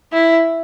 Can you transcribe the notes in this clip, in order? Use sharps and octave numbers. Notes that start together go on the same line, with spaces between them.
E4